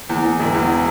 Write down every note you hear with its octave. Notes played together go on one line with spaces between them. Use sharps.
E2
E2
E1
E2